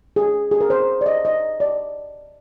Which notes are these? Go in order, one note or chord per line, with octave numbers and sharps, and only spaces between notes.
G#4
G#4
A#4
C5
D5
D#5
D#5
D5